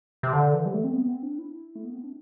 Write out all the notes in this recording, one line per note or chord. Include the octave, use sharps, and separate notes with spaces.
C3
D3
E3
G3
A3
C4
B3
C4
D4
E4
A3
B3
C4
D4